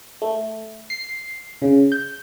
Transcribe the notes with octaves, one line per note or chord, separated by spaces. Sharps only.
A3
C7
C#3
G6